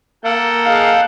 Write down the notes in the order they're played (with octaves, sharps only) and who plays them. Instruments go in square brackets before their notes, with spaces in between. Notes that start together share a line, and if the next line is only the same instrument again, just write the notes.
[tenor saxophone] A#3 [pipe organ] A4 F#5 G5
[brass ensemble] D#4 G#4 F5